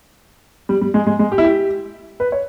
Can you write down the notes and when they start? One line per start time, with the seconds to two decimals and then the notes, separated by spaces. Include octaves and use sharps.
0.69 G3
0.81 G3
0.94 G#3
1.07 G#3
1.19 G#3
1.32 G4
1.38 E4
1.44 G4
2.20 B4
2.32 C#5